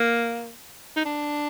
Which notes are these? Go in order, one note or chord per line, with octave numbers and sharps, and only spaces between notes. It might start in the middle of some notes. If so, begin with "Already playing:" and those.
Already playing: A#3
D#4
D4